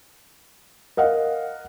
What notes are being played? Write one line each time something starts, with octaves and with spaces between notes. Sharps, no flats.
A#4 D#5 F5 F#5